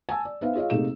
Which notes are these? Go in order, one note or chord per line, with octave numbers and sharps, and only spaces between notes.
G#5 A5 E6
D5
B3 D#4 B4 C5 E5 F5
F4 G#4 C#5 D#5 F5
C3 A3 A#3 D#4 G#4 E7